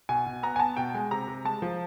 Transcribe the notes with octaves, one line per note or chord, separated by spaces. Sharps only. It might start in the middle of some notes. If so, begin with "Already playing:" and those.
B2 G#5
B2
B3 A#5
G#5
B3 A5
B2 G5
G#3 G#5
C3 A#5
C3
G#3 A5
F3